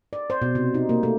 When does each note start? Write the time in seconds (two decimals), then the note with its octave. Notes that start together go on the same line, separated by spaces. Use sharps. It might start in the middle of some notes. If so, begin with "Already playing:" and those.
0.13 D5
0.30 C5
0.42 B2
0.55 C3
0.74 D#4
0.89 A#3
1.03 A3